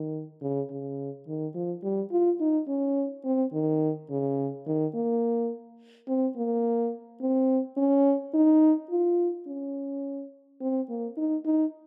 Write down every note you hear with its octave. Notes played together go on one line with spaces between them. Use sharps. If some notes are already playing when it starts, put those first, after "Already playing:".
Already playing: D#3
C#3
C#3
D#3
F3
G3
F4
D#4
C#4
C4
D#3
C#3
D#3
A#3
C4
A#3
C4
C#4
D#4
F4
C#4
C4
A#3
D#4
D#4